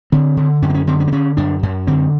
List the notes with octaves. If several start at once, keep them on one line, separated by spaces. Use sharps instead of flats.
D3 C4
D3
F#2 C#4
C4
C#4
D3 C4
C#4
C4
D3 C#4
F#2 D4
F#2
D3 C4